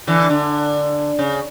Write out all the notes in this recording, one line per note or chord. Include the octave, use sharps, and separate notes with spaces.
D3 E3
D3
C#3